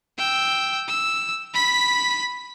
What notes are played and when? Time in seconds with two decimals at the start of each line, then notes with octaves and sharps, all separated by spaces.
0.18 G5 E6
0.88 E6
1.54 B5 B6